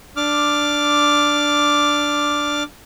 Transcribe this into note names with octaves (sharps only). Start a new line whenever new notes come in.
D4 D6 F6